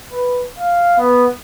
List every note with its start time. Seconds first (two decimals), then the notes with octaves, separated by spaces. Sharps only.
0.12 B4
0.59 F5
0.98 B3